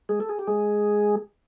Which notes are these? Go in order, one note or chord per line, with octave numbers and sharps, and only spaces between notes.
G#3 G#4
A4
G#4
G4
G#3 G#4